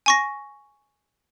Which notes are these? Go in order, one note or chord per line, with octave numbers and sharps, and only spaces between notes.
G#5 C#6 A#6